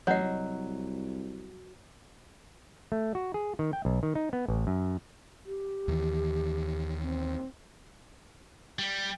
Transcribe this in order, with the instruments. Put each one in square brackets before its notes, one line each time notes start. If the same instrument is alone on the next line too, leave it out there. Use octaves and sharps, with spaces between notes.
[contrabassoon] A1 [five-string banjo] F#3 D#5 [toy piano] C#5 F#5
[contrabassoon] C2
[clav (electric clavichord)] A3
F#4
G#4
D#3
G5
B1
D#3
D#4
B3
A1
F#2
[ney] G4
[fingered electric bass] D#2 D#3 E3
[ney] C4
[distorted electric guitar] G3